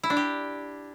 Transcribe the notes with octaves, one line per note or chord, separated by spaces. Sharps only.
E4
D4
G4